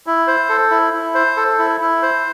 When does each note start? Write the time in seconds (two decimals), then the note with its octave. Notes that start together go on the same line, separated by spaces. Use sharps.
0.07 E4
0.27 C5
0.49 A4
0.71 E4
0.93 E4
1.14 C5
1.37 A4
1.59 E4
1.81 E4
2.02 C5